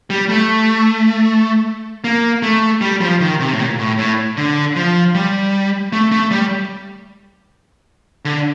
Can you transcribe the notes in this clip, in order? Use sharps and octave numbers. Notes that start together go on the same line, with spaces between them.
G3
A3
A#3
A3
G3
F3
D#3
C3
A2
A#2
A2
A2
D3
F3
G3
A3
A3
G3
D3